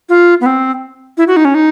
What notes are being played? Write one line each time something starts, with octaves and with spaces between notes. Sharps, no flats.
F4
B3
C4
E4
F#4
D#4
C#4
D#4